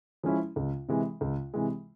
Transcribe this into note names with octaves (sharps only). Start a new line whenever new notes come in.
F3 G#3 C#4 E4
C#2
C3 E3 G#3
C#2
C3 E3 G#3